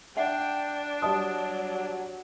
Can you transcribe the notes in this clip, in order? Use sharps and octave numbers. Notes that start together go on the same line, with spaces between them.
D4 E5 F#5 G5
F#3 G3 D#5 A5 D#6